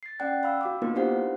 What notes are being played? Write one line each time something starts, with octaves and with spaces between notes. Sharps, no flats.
A6 C7
C#4 D5 F#5 G5 F#6
F5 B5 E6
F#4 F5 D6
A#3 B3 D#4 F4 A#4 B4
D4 E4 G4 C5 F5 F#5